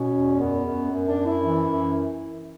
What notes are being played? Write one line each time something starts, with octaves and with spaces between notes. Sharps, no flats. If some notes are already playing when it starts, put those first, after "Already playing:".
Already playing: B2 C#4
E2
F#2 B3
F#2
F#2
D4
F#2
E4
E3
F#2